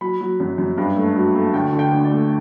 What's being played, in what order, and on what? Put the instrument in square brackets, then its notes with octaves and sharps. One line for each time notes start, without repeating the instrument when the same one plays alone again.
[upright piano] F#3 B5
F#3
F#2
F#2
G2
A3
F#3
A3
D2 G5
D3
G5
D2
D5
A3